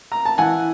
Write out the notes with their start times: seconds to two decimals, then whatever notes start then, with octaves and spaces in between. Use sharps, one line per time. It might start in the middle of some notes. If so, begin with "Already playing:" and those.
0.12 A#5
0.25 A5
0.38 E3 F#5 G#5